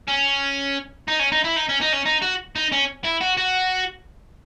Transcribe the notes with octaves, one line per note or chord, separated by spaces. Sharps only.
C#4
D#4
C#4
D#4
E4
D#4
C#4
D#4
C#4
D#4
F#4
D#4
C#4
E4
F#4
F#4